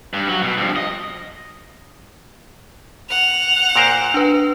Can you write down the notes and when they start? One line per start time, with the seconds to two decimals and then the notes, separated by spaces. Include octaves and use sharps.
0.13 G2
0.29 F#3
0.43 B2
0.58 G2 F3
0.76 D#5
3.09 F#5 F7
3.76 A#2 A#4 C5
4.14 D4 B4